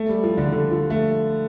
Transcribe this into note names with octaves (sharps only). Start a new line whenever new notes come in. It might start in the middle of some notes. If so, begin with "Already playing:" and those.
Already playing: A3
G3
F3
D3
D3
F3
A3